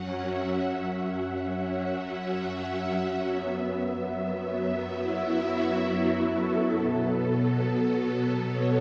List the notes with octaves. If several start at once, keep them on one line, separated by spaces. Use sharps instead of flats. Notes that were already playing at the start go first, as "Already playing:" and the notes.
Already playing: F#2 F#3 C#4 F#5
E5
F#5
E5
E5
F#2 F#3 B3
E4
F#4
F#4
A4
B2 F#3 B3 A4
C#5